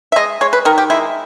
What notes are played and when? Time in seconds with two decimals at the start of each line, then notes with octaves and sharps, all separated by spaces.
0.12 E5
0.16 G#3 D#5
0.41 G#3 C#5
0.53 B4
0.65 D#3 A#4
0.78 G4
0.90 G#3 E4